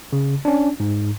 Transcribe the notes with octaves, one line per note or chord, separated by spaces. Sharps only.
C#3
C#4 D4
G#2